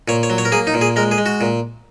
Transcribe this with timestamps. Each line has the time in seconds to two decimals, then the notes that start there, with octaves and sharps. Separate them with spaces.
0.08 A#2 C#5
0.23 C#5
0.30 F#3
0.38 C#5
0.45 A#4
0.52 A#3 G#4
0.67 D#4
0.74 A#2
0.81 G#4
0.96 G#3 A#4
1.11 G#4
1.18 G#3
1.26 F#4
1.41 A#2